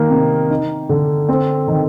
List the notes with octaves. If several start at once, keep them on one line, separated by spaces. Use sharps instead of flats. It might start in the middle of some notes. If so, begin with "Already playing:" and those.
Already playing: D#3 A#3
C3
D#4
D3
C4
D#3